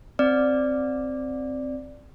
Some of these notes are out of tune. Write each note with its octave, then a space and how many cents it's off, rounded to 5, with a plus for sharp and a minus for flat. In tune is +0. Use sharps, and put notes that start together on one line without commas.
C4 +0 D5 +0